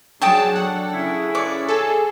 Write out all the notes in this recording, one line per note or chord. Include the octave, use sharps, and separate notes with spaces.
F#3 D4 G#4 C#5 G5 A5 D#6
A4 F#5
C#3 E4 G#4
C#5 D5 D6
G#4 A4 G#5